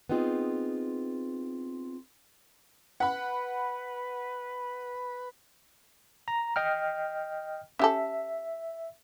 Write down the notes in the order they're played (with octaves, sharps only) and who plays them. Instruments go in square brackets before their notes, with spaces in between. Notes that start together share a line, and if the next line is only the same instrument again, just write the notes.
[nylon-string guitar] B3 C4 D#4 F4 G#4
[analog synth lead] B4 [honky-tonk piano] F#5 B5
[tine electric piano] A#5
D#5 G5 F6
[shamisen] C#4 G4 A4 [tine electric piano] E5